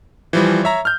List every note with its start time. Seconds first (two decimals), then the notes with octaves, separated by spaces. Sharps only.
0.33 E3 F3 G3
0.64 C#5 E5 A#5
0.85 F6 G6